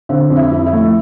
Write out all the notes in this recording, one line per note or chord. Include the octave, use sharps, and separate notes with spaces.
D3 C4
F2
E4
F2
E4
A3